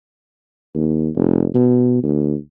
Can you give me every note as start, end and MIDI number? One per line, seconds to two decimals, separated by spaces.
0.75 1.09 39
1.15 1.47 29
1.54 2.00 47
2.03 2.35 38